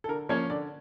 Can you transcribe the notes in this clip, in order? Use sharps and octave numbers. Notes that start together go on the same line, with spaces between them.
A4
D3 A#4
F3 A#3 C#4 C#5
D3 D5